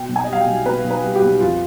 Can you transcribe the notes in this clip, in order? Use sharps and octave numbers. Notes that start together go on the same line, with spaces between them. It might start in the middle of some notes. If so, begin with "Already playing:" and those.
Already playing: B2 G5
B1
G#5
D#5
G3 F5
G5
B1
B2 B4
B1
B4
G3
G4
B1
F2 F4